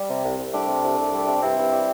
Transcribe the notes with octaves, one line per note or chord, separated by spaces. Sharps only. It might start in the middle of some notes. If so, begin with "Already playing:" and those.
Already playing: G3
C3
C2
C2
G3 A3 D4
C3
C2
C2
G3
C3
G2 C4 E4
G2
G3